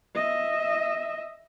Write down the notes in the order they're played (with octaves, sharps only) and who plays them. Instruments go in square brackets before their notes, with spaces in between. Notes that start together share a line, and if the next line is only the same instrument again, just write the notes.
[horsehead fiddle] D#5 E5